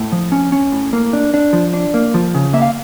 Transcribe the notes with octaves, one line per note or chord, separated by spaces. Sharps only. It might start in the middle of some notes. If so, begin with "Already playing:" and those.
Already playing: A2
F3
C#4
C#4
A2
A#3
D4
D4
F3
D4
A#3
F3
C#3
A#3 E5
F5